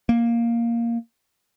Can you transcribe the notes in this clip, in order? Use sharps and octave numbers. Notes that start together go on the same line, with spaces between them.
A#3